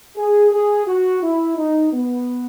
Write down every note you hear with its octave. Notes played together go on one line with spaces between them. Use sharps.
G#4
G#4
F#4
E4
D#4
B3